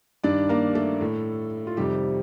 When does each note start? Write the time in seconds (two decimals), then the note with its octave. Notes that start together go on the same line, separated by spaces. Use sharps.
0.24 G2 D#3 D4 D5
0.49 A#3 A#4
0.75 A3 A4
1.01 A2
1.67 F4
1.77 F2 C3 D#3 G3 G4